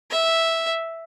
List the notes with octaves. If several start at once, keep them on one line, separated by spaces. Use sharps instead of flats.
E5